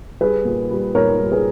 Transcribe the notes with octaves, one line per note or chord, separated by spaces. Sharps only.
G3 G#4 B4
A#2
G3
A#2 A#4 C#5
G3
G#4 B4